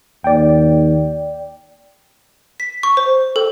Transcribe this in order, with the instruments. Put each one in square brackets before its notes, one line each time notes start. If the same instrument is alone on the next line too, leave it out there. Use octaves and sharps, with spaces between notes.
[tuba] D#2 [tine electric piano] D5 G5
[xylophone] B6
C#6
C5
A4